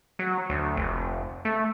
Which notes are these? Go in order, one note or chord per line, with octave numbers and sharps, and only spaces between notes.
F#3
D2
F1
A3